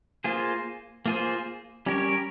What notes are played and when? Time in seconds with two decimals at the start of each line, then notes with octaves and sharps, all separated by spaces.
0.24 A#3 F4 G#4 C5
1.06 A#3 F4 G#4 C5
1.86 G3 C#4 G4 A#4 C#5